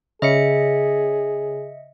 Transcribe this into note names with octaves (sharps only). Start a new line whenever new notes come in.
C#3 G#4 D#5 E5 C#7